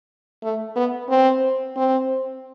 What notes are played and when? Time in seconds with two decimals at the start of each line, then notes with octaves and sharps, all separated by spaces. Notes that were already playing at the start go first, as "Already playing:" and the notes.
0.43 A3
0.76 B3
1.09 C4
1.76 C4